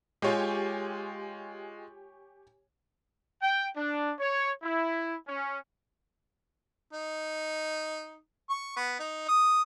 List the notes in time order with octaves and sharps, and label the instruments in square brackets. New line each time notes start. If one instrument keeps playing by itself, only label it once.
[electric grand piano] G#3 F4 [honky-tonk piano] G4 C#5 G#5
[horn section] G5
D4
C#5
E4
C#4
[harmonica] D#4
C#6
B3
D#4
D#6